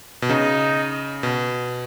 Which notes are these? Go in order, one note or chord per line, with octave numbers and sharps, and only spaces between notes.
B2
C#3 D#4
B2